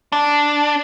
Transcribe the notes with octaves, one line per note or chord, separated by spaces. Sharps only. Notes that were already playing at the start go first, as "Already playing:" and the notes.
D4